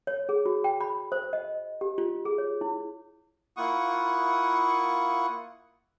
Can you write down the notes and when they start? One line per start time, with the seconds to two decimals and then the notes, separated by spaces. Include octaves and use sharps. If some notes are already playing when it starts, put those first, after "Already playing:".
0.07 C#5
0.29 G#4
0.46 F#4
0.64 G5
0.81 B5
1.12 C5
1.33 D#5
1.81 G4
1.98 F4
2.25 G#4
2.38 C#5
2.61 E4
3.57 A#3 E4 F4 F#5 C#6 D#6